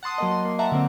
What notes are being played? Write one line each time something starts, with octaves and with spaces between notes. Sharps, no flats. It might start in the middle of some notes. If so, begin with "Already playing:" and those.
F#5 A5 C6 D#6
F#3 A#3 D#5
C6
A#3
E5 F#5 A5 A#5
D3 A#3 C4